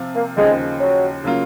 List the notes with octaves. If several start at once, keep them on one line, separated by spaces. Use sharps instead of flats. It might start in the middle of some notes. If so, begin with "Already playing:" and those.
Already playing: C3 F3 C4 F4
A#3
D#2 C#3 F3 G#3
F#3
C#3 F#3 A#3 F4